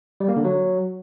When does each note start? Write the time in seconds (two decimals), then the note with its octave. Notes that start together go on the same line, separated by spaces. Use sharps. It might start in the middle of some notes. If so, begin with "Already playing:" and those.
0.20 G3
0.28 A#3
0.37 D3
0.45 F#3